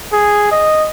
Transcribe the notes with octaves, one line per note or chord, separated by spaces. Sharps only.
G#4
D#5